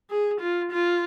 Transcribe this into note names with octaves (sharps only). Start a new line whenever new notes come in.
G#4
F4
F4